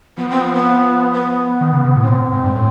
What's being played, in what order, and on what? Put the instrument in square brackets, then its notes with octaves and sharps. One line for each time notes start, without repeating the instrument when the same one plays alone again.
[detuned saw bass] F3 [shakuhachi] B3
[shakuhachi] C4
B3
B3
B3
[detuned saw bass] D#3
C#3
C3
A2
[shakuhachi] C#4
[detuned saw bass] A#2 [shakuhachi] C4
[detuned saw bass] G#2
G2
A2